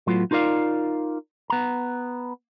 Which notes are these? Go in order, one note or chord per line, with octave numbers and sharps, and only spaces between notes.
A2 F#3 B3 F4
D#4 F4 A#4 D5 F5
B3 A#5